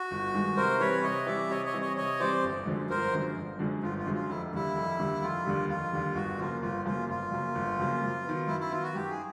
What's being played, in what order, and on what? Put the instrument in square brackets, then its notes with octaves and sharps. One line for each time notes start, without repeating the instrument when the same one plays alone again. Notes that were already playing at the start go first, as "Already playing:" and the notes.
Already playing: [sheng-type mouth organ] F#4
[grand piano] G1
G2 D#3 G#3
[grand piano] C3 [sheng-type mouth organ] A#4 C5
[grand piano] E3 G3 C4 E4 [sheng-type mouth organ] B4 C#5
[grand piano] C3 [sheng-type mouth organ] C#5 D#5
[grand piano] E3 G3 C4 E4 [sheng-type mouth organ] D5 E5
[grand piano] C3 [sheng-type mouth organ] C#5 D#5
[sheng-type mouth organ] C#5 D#5
[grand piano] E3 G3 C4 E4
[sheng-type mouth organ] C#5 D#5
[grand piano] C3 [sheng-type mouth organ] C#5 D#5
[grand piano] E3 G3 C4 E4 [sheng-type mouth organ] C5 D5
[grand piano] G1
F#2 D3 F3 G#3
[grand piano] G1 [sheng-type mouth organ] A#4 C5
[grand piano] F#2 D3 F3 G#3
G1
F#2 D3 F3 G#3
[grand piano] G1 [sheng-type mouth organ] F4
[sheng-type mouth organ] F4
[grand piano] F#2 D3 F3 G#3
[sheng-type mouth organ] F4
[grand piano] F1 [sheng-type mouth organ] E4
[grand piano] D#2 D3 G3 [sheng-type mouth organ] E4
[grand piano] F1
D#2 D3 G3
[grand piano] F1 [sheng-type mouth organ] F4
[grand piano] D#2 D3 G3
[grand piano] F1 [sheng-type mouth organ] F4
[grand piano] D#2 D3 G3
[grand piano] G1 [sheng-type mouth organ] F#4
[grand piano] F#2 C#3 F3 A#3 [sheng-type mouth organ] F4
[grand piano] G1 [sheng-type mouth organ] F4
[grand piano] F#2 C#3 F3 A#3 [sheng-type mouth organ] F4
[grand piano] G1 [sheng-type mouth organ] F4
[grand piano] F#2 C#3 F3 A#3
G1
F#2 C#3 F3 A#3
F#2
D#3 F#3 B3
[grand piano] F#2 [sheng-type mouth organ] E4
[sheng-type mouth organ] E4
[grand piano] D#3 F#3 B3 [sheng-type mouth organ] F4
[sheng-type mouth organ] F#4
[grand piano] F#2 [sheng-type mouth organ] G4
[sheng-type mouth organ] G#4